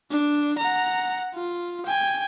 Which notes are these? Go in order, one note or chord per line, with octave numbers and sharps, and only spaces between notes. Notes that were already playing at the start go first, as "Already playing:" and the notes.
D4
F#5 A#5
F4
G5 G#5